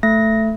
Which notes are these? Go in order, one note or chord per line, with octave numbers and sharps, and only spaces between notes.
A3 A#6